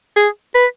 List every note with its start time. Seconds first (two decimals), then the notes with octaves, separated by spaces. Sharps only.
0.17 G#4
0.55 B4